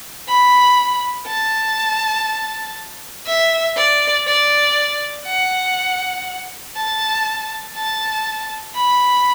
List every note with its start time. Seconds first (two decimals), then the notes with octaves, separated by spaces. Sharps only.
0.28 B5
1.27 A5
3.27 E5
3.76 D5
4.27 D5
5.26 F#5
6.76 A5
7.75 A5
8.75 B5